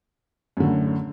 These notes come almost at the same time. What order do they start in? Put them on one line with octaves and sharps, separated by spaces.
F#2 D3 A2